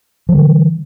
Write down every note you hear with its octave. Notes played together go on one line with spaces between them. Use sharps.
D3 E3 F3 G3